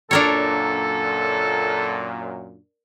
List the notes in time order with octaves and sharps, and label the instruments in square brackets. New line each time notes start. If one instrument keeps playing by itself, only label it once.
[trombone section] F#2 A#2 [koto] D4 A#4 C#5 [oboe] A4